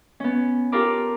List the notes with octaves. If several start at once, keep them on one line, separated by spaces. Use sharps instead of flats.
B3 C#4
F4 G4 A4 A#4 B5 D6